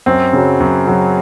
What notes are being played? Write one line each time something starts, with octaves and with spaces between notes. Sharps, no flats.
F#2 C4
C#3 F#3
F#2
C#3 F#3